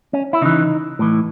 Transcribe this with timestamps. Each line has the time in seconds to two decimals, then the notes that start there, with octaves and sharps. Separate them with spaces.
0.13 C#4
0.33 E4
0.41 C#3 E3 D#4
0.99 A2 E3